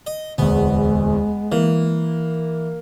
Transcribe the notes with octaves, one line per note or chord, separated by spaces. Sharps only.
D#5
D1 E2 G#3 B3
E3 A#3